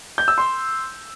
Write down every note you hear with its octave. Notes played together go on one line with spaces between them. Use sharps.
G6
E6
C6